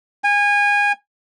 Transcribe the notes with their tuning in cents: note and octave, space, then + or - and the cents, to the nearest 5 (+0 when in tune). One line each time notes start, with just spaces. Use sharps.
G#5 -25